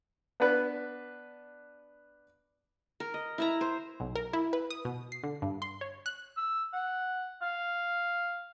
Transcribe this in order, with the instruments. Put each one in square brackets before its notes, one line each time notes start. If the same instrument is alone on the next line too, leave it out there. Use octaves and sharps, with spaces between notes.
[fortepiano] B3 D4 B4
[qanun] A#4
D#5
E4 E5 A#5
C5
[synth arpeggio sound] B1
A#4
E4
B4
D#6
B2
C7
D3
G2
C6
C#5
F#6
[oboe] E6
F#5
F5